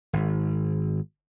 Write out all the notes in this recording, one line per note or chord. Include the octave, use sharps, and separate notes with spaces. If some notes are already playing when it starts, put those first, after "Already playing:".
G#1